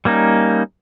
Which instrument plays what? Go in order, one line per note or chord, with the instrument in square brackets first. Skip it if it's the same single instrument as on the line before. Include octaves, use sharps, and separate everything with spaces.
[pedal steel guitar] G3 A#3 C#4 D#4